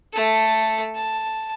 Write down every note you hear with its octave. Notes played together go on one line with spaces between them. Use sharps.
A3 A4
A5